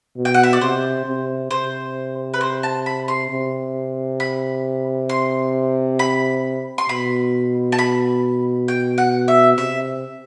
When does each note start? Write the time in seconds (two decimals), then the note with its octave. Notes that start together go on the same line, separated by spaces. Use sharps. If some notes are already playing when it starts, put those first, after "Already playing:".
0.17 B2
0.25 G5
0.34 F#5
0.43 E5
0.53 D5
0.61 C3 C5
1.06 C3
1.51 C3 C5
2.34 B4
2.41 C5
2.63 A5
2.86 B5
3.08 C6
3.30 C3
4.20 B5
5.09 C6
5.99 B5
6.78 C6
6.89 B2 B5
7.72 A5
7.79 B5
8.68 G5
8.98 F#5
9.28 E5
9.58 C3 E5